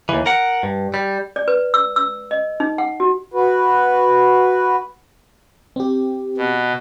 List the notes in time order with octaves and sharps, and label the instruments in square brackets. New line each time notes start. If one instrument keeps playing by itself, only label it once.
[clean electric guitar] D#2 E3
A#4 F#5
G2
G3
[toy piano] D5
B4
E6
E6
D#5
D#4
F#5
F#4
[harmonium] F#4 B4
[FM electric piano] C4 G4
[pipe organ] B2